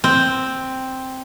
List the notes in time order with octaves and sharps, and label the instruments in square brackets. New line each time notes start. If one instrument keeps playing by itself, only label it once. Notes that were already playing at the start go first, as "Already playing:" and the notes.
[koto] C4